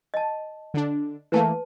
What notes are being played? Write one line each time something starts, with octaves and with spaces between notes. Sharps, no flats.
D#5 A5
D3 D4
E3 A3 A#3 B4 A5